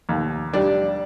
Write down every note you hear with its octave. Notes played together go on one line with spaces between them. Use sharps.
D#2
G3 D4